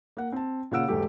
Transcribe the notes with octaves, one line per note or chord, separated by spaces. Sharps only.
A#3 F#5
C4 A5
A#2 C#3 F5 F#5 E6 D7
E1 G#2 A3 G4